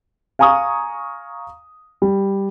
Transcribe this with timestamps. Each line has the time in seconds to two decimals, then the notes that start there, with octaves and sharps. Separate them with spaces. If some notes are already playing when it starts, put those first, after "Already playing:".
0.39 F5 G#5 A#5 C#6 D#6
2.02 G3